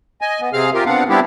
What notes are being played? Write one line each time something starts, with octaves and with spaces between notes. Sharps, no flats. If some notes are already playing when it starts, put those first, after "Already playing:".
D#5 G#5
B3
C3 C4 G#4 F5 F6
C3 F4 G4 A#4
B3 C4 D4 F5 F#5
G3 B3 C4 D4 E4 G4